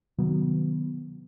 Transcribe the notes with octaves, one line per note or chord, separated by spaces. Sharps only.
C3 D#3 F#3 B3